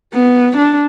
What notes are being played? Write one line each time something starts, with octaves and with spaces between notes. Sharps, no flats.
B3
D4